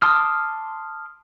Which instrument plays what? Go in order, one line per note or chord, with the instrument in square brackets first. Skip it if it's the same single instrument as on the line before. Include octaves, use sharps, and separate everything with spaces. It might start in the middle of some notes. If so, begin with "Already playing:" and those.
[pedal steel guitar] A5 C6 D6 D#6 F6